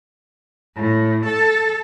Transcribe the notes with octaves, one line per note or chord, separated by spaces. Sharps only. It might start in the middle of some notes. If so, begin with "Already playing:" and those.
A2
A4